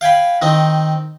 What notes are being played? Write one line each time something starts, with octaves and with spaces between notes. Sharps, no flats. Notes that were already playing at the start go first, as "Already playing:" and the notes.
F5 G5 G#5 B5
D#3 C4 D#4